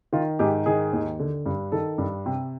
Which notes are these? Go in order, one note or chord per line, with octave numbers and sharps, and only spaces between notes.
D#3 F4
G#2 G4
D#3 G#4
D#2
D3
G2
D#3 A4
G2
C3